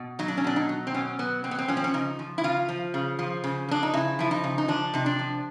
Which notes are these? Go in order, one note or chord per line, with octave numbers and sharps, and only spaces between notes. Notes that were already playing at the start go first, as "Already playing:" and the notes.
Already playing: B2
F#3 D#4
D4
C#4
B2 D4
D#4
F#3
C4
B2 C#4
F#3 B3
B2 C4
B3
C4
F3 C#4
C4
C#4
C#3 D#4
F3
E4
C#3 F4
F3
C#3
F3
C#3
F3 D4
D#4
C#3 E4
F3 E4
D#4
C#3
D#4
F3 D4
C3 D#4
D4
F3